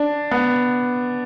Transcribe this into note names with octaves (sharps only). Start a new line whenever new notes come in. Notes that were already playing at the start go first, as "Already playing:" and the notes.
Already playing: D4
B3